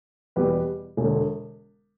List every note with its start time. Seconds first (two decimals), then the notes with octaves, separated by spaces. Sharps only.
0.36 E2 B2 G3 G4 B4
0.97 E1 D3